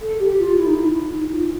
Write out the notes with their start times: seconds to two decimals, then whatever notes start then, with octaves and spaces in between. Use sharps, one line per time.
0.01 A4
0.19 G4
0.39 F4
0.57 E4
0.66 D#4
0.75 E4
0.93 E4
1.12 D#4
1.32 F4